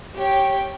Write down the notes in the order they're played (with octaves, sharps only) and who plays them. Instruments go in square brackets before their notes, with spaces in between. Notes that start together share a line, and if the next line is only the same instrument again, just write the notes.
[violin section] G4 C#5 G5